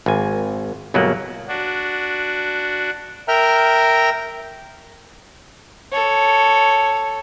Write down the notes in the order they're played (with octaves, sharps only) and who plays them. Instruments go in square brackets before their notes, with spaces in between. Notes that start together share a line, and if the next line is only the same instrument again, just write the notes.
[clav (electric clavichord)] G#1 G#5
G1 B2 F#3 G#3 A#3 F#5
[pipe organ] D4 F#4
[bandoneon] A#4 E5 G5 A#5 F6
[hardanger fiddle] A4 C#5